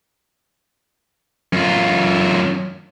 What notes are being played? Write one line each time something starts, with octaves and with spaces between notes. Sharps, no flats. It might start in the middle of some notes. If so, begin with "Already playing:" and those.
F#2 F4